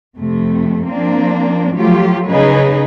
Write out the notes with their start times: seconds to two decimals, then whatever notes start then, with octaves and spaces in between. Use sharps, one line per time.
0.17 F2 C3 A3
0.87 F3 A#3 C4 D4
1.73 F3 F#3 A3 F4 G4
2.29 C#3 D#4 G#4 B4